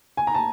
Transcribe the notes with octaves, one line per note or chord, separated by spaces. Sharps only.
G#5
A#5
A5